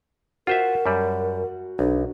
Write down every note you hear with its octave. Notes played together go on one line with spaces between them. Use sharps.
F4 F#4 A#4 C5 E5 F#5
F#2 G3
B1 D4